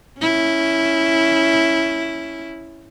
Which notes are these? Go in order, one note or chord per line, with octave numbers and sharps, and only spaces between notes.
C#4 E4